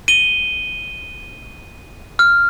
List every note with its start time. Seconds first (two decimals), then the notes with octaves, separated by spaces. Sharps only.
0.08 D#7 G7
2.19 F6